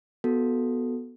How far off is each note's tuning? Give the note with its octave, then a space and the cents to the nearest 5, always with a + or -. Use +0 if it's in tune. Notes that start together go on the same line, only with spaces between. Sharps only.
B3 -5 F#4 +0 A4 +0